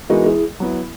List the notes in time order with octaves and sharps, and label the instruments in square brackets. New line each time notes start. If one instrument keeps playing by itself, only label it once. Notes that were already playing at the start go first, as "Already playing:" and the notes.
[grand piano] E3 G#3 B3 D#4 [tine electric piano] F#4 A#4
[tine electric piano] E4 G#4
[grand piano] F#3 B3 E4